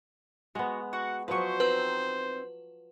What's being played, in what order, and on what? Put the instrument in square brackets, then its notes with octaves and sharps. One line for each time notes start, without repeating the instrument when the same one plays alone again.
[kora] G#3 B3 [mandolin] F#4
[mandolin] F#4 [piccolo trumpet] F#5
[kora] F3 F#3 [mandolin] B4 D#5 C#6 [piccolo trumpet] C5
[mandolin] C4 D#4 G6 [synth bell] B4